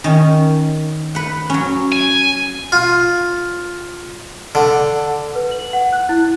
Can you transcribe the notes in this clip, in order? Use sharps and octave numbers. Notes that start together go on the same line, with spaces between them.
D#3 C#4
B4 F#5
F#3 C#4
G#5
F4
D3
B4
F#7
F#5
F#6
E4